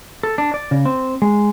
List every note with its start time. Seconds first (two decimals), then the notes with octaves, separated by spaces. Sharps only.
0.23 A4
0.38 D4
0.54 D5
0.71 C#3
0.85 C4
1.22 G#3